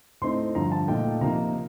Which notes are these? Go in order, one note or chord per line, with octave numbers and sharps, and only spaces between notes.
A2 A3 C4 D#4 C6
G2 D3 F3 A#5
A5
A#2 A3 D#4 G5
C3 F3 A#3 D#4 A#5